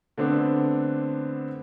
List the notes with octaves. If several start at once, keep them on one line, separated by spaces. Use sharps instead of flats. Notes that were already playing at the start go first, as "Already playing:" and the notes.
D3 A3 B3 C4 D4